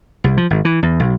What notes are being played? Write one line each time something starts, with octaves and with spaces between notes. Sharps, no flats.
C2
F3
G#1
E3
E2
B1